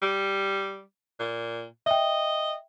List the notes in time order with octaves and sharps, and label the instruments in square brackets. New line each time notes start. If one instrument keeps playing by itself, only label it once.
[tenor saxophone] G3
A#2
[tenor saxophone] D#5 [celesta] E5 G5